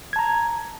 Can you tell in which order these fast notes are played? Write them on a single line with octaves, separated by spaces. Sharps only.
G#6 A5 A#5